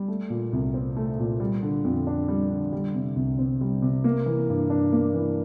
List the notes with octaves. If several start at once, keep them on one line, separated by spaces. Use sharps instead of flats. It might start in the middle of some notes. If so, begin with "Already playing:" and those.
Already playing: G3
A3
A#2
C2
C4
A3
A#2
G3
D3
F2
D4
G3
D3
G3
C3
C2
C4
G3
C3
A#3
E3
G2
D4
A#3
E3